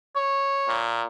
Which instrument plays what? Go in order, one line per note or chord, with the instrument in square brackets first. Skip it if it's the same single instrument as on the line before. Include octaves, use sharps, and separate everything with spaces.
[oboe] C#5
[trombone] A#2